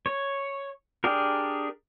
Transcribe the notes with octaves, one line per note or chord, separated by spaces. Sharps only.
C#5
D4 G4 G#4 A#4